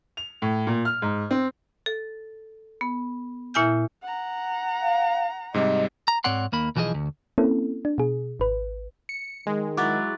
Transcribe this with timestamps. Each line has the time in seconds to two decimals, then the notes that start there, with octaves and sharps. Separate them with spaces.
0.17 F7
0.42 A2
0.67 A#2
0.85 F6
1.02 G#2
1.31 C4
1.86 A4
2.81 B3
3.54 A#2 E4 E5 G#5 F6 G6
4.03 F#5 A#5
4.82 F5
5.54 G#2 C3 G3 D#5
6.08 A#5
6.24 G#2 C4 C#5 D5 F#5 C6
6.52 D#2 A#3 B5
6.76 B1 E3 F3 G4 G#4 D#5
6.94 D2
7.38 A#3 C4 C#4 E4 A4
7.85 D4
7.98 B2 G#4
8.40 G#1 B4
9.09 C#7
9.47 D#3 G#3
9.77 F#3 E4 D6 F#6 A6